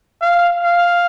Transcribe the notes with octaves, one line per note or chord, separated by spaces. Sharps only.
F5
F5